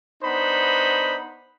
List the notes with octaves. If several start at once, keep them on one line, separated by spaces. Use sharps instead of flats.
B3 D4 D#4 C5 B5